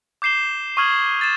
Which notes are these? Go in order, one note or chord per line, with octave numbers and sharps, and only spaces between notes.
D6 G6 C7 E7 G7
C#6 D#6 F6 G#6 F#7
A6 E7